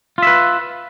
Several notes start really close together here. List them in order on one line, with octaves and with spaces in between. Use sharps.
F4 E5 B4